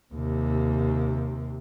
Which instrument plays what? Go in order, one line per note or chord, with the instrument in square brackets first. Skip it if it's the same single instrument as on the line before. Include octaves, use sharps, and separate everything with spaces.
[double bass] D#2 C3